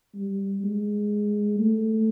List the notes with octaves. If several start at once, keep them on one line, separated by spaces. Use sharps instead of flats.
G3
G#3
A3